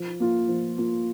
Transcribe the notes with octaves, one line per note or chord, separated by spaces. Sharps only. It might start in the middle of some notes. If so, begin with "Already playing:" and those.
Already playing: F3
A#3 F4
F3
A#3 F4